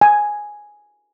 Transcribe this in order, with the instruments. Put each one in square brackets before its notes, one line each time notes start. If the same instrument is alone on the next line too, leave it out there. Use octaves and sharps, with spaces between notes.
[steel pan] G#5